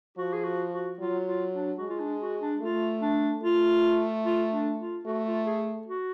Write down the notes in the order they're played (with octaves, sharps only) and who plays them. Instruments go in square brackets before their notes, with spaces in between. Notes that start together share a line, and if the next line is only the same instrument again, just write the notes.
[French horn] F3 [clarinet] F#4
[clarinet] G#4
F#4
F#4
[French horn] F#3 [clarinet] F4
[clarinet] F4
D4
[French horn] G#3 [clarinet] F#4
[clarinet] F4
D4
F#4
D4
[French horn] A3 [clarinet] F4
[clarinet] D4
[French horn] A3 [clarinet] F4
[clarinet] F4
D4
F4
[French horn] A3 [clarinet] F#4
[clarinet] F4
G#4
F#4